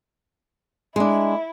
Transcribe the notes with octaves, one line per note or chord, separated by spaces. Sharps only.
G#3 D4 E4